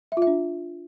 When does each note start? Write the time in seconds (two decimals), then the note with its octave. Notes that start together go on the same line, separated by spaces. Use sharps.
0.12 E5
0.17 F4
0.22 E5
0.27 D4